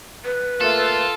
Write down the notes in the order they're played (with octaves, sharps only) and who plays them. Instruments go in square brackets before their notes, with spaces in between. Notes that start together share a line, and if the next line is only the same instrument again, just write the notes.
[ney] B4
[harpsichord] A3 A#3 [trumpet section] F4 [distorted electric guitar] A4